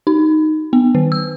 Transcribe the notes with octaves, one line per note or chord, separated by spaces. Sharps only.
D#4
B3
D#3
E6